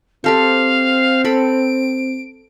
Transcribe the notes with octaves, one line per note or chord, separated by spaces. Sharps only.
C4 G4 A4 C5 F5
A4 B5 D7